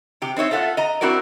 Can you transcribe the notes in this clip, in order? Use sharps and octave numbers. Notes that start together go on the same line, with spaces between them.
C3 G4
C4 D#4 C#5 E5
F4 A4 E5 F#5
D#5 A#5
C4 E4 F#4 A#4 D5